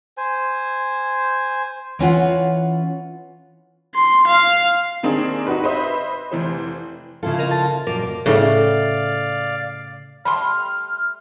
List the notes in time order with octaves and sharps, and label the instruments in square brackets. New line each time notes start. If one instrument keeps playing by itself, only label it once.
[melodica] C5 G#5
[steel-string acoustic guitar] E3 C#4 F4 F#5
[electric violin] C6
F5
[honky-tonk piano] D#3 A#3 C4 D4 D#4 G#4
D#4 F#4 B4
B4 C5 D#5 E5
F1 E3 C5
[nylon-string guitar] C#3 E4 A4 [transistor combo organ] F3 F4
[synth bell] A#4 D#5
A5 A6
[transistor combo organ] F#2 A#2 D6 [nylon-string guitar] F3 [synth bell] A#4
[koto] A2 C#3 [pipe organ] D5 F5
[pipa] G3 A3 C6 [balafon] B5 [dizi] F6